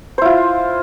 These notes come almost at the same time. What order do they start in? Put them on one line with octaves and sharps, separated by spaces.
C5 E4 F4